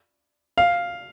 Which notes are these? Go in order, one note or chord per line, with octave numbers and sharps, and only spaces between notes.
F5